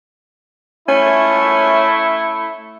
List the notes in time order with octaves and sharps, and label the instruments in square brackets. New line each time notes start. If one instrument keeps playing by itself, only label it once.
[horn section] A3 E4 [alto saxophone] C#4